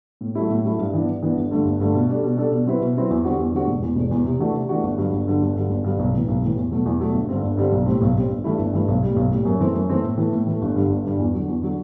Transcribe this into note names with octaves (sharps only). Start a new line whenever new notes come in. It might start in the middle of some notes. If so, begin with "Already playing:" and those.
A2
F#3 A3 E4
A2
F#3 A3 E4
G2
E3 B3 D4
G2
E3 B3 D4
G1
G2 D3 A3
G1
G2 D3 A3
B2
G3 D4 A4
B2
G3 D4 A4
B2
F#3 C4 E4 B4
B2
F#3 C4 E4 B4
E2
D3 G3 C4 F#4
E2
D3 G3 C4 F#4
E1
E2 B2
E1
E2 B2
C3
E3 A3 D4 F#4
C3
E3 A3 D4 F#4
G1
G2 D3 F#3
G1
G2 D3 F#3
G1
G2 D3 F#3
G1
G2 D3 F#3
B1
A2 E3
B1
A2 E3
E2
B2 F#3 A3
E2
B2 F#3 A3
G1
G2 D3 G3 C4
G1
G2 D3 G3 C4
B1
A2 G3 C4
B1
A2 G3 C4
G1
G2 E3 A3 E4
G1
G2 E3 A3 E4
B1
A2 G3
B1
A2 G3
F#2
E3 A3 C4
F#2
E3 A3 C4
A2
E3 A3
A2
E3 A3
G1
G2 D3 G3
G1
G2 D3 G3
E2
D3 F#3
E2
D3 F#3